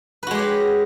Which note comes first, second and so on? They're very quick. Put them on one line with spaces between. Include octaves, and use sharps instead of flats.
B4 F#4 G#3 G4 C#5